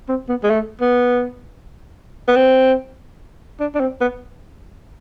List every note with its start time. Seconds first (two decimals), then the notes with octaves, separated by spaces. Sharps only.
0.09 C4
0.29 B3
0.43 G#3
0.50 A3
0.81 B3
2.28 B3
2.36 C4
3.60 D4
3.75 D4
3.80 C4
4.01 B3